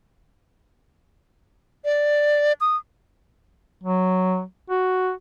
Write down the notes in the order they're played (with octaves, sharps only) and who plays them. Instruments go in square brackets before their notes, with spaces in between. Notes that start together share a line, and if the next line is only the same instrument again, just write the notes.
[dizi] D5
D#6
[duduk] F#3
F#4